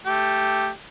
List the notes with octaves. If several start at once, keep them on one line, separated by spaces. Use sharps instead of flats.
A3 G4